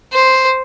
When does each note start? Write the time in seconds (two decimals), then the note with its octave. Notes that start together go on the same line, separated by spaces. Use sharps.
0.13 C5